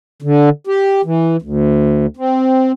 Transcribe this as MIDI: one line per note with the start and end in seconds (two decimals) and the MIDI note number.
0.22 0.49 50
0.67 1.02 67
1.05 1.37 52
1.42 2.06 38
2.17 2.72 60